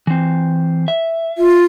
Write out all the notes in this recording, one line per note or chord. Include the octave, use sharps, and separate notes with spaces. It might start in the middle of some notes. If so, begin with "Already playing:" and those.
E3 C4
E5
F4